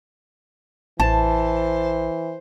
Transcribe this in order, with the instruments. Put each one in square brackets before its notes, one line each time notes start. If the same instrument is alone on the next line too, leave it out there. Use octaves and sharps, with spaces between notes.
[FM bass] A1 [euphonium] E3 [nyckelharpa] C5 [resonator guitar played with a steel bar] A5